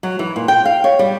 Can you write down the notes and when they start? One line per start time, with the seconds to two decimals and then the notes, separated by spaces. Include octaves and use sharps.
0.03 F#3
0.19 E3
0.36 A#2
0.48 G5
0.65 F5
0.84 C#5
0.99 G3